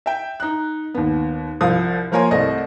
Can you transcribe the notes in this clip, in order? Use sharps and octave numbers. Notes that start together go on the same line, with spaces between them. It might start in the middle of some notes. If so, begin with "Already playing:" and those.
E5 G5
D#4 F#6
D#2 B3
C2 F3 F5 D#6
F3 A#3 A#4 C#5 G#5 C6
C2 A3 C4 D5 D#5